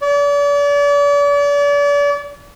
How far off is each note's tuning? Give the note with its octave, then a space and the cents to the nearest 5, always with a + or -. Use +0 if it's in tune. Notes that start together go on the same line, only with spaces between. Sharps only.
D5 -40